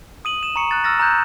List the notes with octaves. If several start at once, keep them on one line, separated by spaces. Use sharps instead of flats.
D#6 D#7 F#7
E7
A#5 C#6 C#7
F#6 A6
E6 F6 A6 A#6
A#5 D#6 F#6 G6